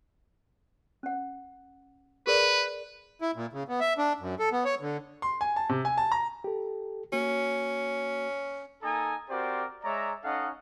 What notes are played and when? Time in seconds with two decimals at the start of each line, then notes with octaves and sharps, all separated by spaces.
1.03 C#4 F#5
2.27 G#4 A#4 B4 D5
3.22 E4
3.36 A#2
3.53 C#3
3.68 B3
3.80 E5
3.98 D4
4.20 F#2
4.39 A4
4.52 B3
4.65 C#5
4.81 D3
5.22 C6
5.41 G#5
5.56 A5
5.69 C3
5.85 G#5
5.98 A5
6.12 A#5
6.44 G4 A4
7.12 A#3 C#4 F#4
8.83 A#3 D#4 A4 G#5 A#5 D#6
9.30 C4 F#4 G4 A#4 C5 D5
9.83 G#3 C#5 D5 E5 A#5
10.24 C#4 D#4 A4 D#5 F5 F#5